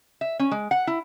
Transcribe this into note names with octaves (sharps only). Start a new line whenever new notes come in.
E5
C#4
G#3
F#5
E4